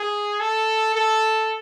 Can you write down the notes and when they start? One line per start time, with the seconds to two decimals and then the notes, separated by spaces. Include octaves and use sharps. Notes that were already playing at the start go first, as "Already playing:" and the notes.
Already playing: G#4
0.40 A4
0.95 A4